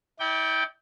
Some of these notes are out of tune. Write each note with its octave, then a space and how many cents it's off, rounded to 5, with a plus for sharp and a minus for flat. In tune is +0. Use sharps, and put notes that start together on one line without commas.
E4 -40 D5 +0 G5 +0